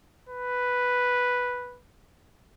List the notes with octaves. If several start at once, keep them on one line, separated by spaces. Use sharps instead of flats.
B4